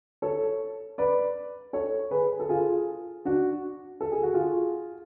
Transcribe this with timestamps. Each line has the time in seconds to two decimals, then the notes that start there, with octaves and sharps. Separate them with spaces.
0.22 A4 C#5
0.98 B4 D5
1.73 A4 C#5
2.11 G#4 B4
2.40 A4
2.49 F4 G#4
3.25 D4 F#4
4.01 A4
4.12 G#4
4.23 F#4
4.34 F4 G#4